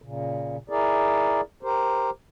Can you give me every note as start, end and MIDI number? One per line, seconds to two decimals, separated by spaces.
0.02 0.57 46
0.02 0.57 49
0.70 1.41 64
0.70 1.41 68
0.70 1.41 70
0.70 1.41 74
1.63 2.10 67
1.63 2.10 70
1.63 2.10 72